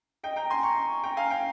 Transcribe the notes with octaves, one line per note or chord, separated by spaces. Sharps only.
D#5 G5
G5 A#5
G#5 C6
A#5 C#6
G5 A#5
F5 G#5
G5 A#5